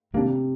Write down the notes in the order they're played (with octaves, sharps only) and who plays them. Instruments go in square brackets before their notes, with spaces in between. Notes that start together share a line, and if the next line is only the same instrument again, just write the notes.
[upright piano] C3 [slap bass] D#3 A#3 D4